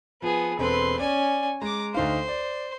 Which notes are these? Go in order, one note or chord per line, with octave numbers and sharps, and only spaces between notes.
F3 B3 G#4
E1 C4 A4 B4 C6
C#4 D5 G#5
G#3 A#5 D6
D2 D#4 C5 F5
D5